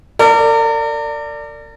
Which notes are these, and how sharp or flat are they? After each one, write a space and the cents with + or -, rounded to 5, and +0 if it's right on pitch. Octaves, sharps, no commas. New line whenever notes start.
A#4 -40 D5 +0